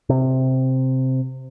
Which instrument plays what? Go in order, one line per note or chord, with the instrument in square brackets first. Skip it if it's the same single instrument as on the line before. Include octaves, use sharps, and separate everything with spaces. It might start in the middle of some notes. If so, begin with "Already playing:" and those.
[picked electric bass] C3